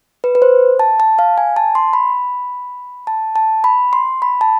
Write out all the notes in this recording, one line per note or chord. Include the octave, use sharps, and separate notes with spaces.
B4
B4
C5
A5
A5
F5
G#5
A5
C6
B5
A5
A5
B5
C6
B5
A5